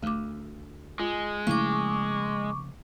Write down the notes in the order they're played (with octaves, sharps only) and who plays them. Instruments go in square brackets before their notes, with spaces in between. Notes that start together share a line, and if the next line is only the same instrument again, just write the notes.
[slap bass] D2 [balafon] A3 D6
[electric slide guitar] G#3 [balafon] F4
[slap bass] C#3 F3 A#3 [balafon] A3 E4 [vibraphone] C#6 D6